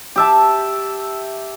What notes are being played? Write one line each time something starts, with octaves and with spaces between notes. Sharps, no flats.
G4 E5 A5